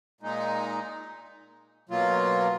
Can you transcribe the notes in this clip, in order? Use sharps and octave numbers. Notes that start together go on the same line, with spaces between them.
A#2 G#3 D#4
B2 F#3 A#3 F4